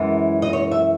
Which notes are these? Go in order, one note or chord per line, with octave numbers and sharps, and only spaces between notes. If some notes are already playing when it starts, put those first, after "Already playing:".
Already playing: F#2 E3 G#3
D#5
C#5
E5